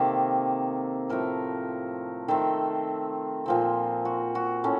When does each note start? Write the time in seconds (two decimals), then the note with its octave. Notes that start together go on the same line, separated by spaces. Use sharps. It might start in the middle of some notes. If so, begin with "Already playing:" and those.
Already playing: C3 D#3 A#3 A4
1.09 A2 F3 A3 A#4
2.28 D#3 A3 C4 A4
3.46 A#2 F3 C4
4.05 F#4
4.35 F#4
4.64 A2 A3 C#4